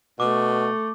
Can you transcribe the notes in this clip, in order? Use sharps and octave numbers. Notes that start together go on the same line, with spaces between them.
B2 A3 D6